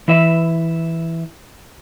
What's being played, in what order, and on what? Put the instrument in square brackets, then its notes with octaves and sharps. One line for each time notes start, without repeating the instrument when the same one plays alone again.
[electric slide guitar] E3 E4 E5